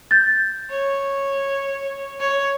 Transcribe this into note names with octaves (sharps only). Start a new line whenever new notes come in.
G6 A6
C#5
C#5